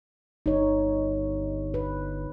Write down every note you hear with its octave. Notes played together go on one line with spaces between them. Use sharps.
G1 D#4 C#5
B4